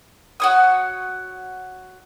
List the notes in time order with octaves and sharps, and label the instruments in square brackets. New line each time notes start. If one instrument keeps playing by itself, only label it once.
[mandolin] F#4 C#5 D#6